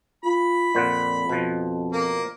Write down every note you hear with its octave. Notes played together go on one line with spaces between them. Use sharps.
F4 B5
F2 A#2 C5 F#5
B2 F3
A#3